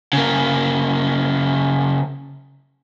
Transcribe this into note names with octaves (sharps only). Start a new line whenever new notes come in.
C#3 A#3